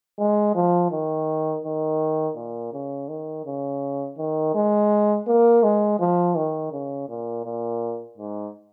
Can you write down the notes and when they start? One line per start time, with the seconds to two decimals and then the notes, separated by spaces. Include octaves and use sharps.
0.19 G#3
0.55 F3
0.91 D#3
1.64 D#3
2.36 A#2
2.73 C#3
3.09 D#3
3.46 C#3
4.18 D#3
4.55 G#3
5.27 A#3
5.63 G#3
6.00 F3
6.35 D#3
6.72 C#3
7.09 A#2
7.45 A#2
8.18 G#2